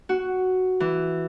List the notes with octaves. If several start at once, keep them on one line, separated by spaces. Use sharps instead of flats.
F#4
E3